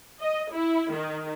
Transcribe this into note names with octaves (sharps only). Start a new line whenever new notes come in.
D#5
E4
D#3